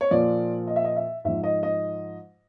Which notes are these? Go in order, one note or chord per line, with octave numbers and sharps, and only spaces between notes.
C#5
A#2 F3 D5
D#5
E5
D#5
E5
G#2 F3 E5
D#5
D#5